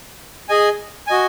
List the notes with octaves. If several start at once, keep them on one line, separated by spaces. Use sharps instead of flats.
G#4 D#5 G#5
F#4 D#5 G#5